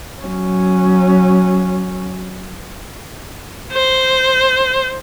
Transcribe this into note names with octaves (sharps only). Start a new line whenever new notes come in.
F#3 C#4
C5